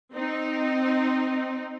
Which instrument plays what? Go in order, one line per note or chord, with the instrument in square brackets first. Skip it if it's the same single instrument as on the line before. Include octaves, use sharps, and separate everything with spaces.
[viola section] C4 D#4